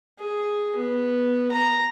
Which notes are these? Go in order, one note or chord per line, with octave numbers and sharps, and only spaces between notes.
G#4
B3
A#5